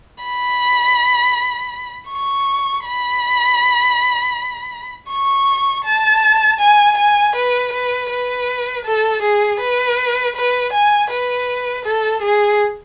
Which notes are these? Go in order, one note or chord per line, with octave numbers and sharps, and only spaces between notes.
B5
C#6
B5
C#6
A5
G#5
G#5
B4
B4
B4
A4
G#4
B4
B4
G#5
B4
A4
G#4